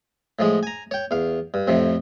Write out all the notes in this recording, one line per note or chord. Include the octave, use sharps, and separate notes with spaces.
A2 F3 G#3
G#5 A#5
C#5 G5
E2 F5
G2
F2 A2 C3 F3